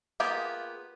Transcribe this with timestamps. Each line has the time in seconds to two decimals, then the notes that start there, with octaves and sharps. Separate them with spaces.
0.20 A#3 B3 F4 G4 G#4